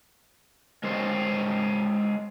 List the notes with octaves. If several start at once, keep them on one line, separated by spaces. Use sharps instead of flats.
G#3 A#4 C5 C#5 D#5